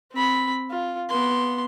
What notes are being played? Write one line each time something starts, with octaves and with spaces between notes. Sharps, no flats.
C4 B5
F4
B3 C6